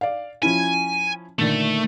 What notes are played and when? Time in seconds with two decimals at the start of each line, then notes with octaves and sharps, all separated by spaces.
0.01 D5 F5
0.43 F3 C#4 E4 G#5
1.39 A#2 D3 D#3 A3